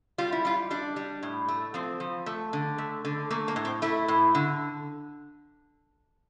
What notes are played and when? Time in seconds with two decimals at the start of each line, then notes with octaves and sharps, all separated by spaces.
0.18 G3 F4
0.32 E4
0.45 G3 F4
0.71 G3 D4
0.96 G3
1.23 A2
1.48 A3
1.74 F3 C4
2.00 F3
2.26 A3
2.53 D3
2.78 A3
3.05 D3
3.30 A3 A#3
3.48 A#3
3.56 A2
3.65 C4
3.82 A3 E4
4.08 A2
4.35 D3